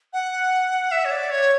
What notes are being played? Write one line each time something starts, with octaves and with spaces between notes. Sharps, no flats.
F#5
E5
C#5
D5
C#5